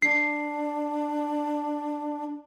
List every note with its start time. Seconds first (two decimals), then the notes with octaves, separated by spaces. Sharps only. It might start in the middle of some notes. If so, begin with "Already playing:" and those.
0.02 D4 C7